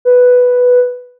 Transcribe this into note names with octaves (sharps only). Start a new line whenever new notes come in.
B4